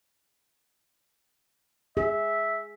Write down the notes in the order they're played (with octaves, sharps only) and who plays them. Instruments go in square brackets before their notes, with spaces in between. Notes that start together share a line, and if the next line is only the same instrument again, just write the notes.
[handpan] G#4 [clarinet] E5